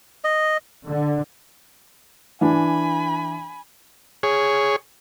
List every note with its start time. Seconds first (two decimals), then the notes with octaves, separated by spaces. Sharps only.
0.24 D#5
0.89 D3
2.41 E3 D4 G#5 B5
4.23 G#4 C#5